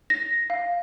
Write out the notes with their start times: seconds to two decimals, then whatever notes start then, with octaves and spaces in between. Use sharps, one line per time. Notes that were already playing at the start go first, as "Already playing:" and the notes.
0.10 A#6
0.50 F5